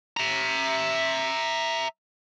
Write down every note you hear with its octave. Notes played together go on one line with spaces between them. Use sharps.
E5 A#5